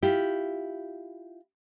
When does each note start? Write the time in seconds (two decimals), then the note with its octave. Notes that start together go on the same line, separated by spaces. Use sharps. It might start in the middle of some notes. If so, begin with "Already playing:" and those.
0.03 E4 F4 G4